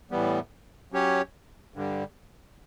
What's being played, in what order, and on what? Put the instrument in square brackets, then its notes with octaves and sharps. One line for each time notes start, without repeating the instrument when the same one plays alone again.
[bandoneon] A2 E3 G3 B3
F#3 C#4 G4 C#5
G2 D3 G3